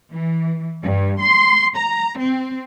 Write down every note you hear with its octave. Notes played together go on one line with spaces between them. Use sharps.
E3
G2
C6
A#5
C4